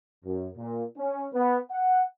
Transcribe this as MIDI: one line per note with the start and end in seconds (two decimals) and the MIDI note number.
0.25 0.49 42
0.57 0.84 46
0.97 1.26 61
1.33 1.57 59
1.70 2.02 78